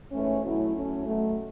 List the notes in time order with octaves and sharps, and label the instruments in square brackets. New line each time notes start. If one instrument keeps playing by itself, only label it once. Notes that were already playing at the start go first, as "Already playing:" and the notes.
[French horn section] G#2 E3 A3 C#4
B2 F#3 A3 E4
F#3 A3 C#4
B2 F#3 A3